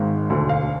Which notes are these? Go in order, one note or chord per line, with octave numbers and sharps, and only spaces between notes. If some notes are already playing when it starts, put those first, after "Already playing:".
Already playing: G#1 G#2 D#3
E1 D2 D3
F5